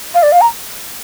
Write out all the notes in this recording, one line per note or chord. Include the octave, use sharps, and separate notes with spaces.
F5
D5
F5
A#5